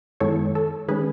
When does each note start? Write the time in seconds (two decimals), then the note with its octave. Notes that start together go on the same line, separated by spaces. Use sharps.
0.20 F#2 D#3 G#3 B3 E4 A4 C#5
0.55 A4
0.88 D#3 G#3 C#4 G#4 B4